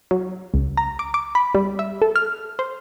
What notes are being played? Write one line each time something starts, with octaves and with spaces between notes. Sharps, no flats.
F#3
C#2
A#5
D6
D6
B5
G3
E5
A4
F6
C5